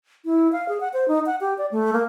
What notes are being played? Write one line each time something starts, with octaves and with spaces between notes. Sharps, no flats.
E4
F5
G#4
F#5
C5
D#4
F#5
G4
D5
A3
A#3